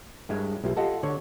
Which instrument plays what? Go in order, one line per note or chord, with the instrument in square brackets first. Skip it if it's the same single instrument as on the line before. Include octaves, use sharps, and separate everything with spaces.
[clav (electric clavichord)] G2 G#3 [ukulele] E4 A#4 C#5
[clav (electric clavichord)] B1 [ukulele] E4 F4 G4
[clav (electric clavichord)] F4 A4 [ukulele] G4 D#5 F#5
[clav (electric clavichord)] D3 [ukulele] C#5